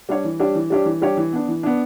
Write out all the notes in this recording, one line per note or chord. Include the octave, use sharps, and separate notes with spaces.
G3 D4 G4 C#5
E3
G3 D4 G4 C#5
E3
G3 D4 G4 C#5
E3
G3 D4 G4 C#5
E3
B3 D4
E3
B3 D4